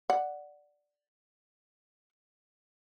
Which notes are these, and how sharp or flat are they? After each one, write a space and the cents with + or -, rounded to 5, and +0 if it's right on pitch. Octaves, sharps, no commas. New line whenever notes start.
D5 +0 F#5 +0